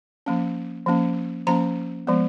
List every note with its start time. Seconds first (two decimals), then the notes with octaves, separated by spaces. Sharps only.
0.26 F3 A#3 C#4
0.86 F3 A#3 C#4
1.47 F3 A#3 C#4 A#5
2.07 F3 G#3 B3